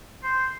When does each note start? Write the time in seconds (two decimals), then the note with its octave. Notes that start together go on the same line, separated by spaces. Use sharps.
0.23 C5